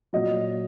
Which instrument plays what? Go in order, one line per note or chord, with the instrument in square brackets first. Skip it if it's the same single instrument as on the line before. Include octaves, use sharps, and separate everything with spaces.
[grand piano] A#2 F#3 D#5